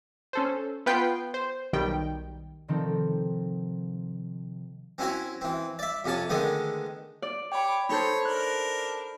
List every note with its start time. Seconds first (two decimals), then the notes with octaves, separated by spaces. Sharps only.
0.33 C#4 A4 C5
0.86 B3 F4 B4 G5 G6 C7
1.34 C5
1.73 B1 D#3 G3 G5
2.68 C3 D#3 F3 C4 D#4 A4
4.98 C4 C#4 E4 F#4 C#5
5.41 E3 C4
5.79 D5 E5
6.04 F2 C3 C#4 A5
6.30 D3 D#3 G#3 A3 B3
7.22 D5
7.52 G4 C#5 G5 B5 D6
7.89 D#4 A4 C5 C#5 B5 G6
8.25 D4 A#4 F#6